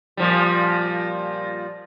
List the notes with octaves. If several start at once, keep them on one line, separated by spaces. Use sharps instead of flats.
A#2 F3 G3